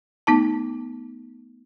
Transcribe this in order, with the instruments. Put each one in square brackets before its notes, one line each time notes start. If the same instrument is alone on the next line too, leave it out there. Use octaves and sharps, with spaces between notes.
[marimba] A3 B3 D#4 A5